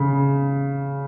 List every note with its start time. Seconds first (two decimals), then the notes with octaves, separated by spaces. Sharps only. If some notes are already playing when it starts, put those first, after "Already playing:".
Already playing: C#3